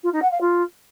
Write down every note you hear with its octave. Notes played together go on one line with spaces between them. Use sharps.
F4
D#4
F#5
F5
F4